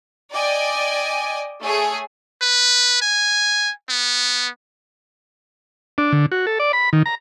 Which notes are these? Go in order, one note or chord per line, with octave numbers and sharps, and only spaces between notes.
D5 D#5 G5 G#5
A3 G#4 C#5 G#5
B4
G#5
B3
D4
D3
F#4
A4
D5
B5
D#3
A#5